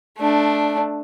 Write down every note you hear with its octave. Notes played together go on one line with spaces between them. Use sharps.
A3 D4